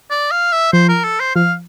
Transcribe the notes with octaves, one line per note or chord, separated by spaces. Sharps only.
D5
F5
E5
F3 C5
A#4
A4
C5
F3 F5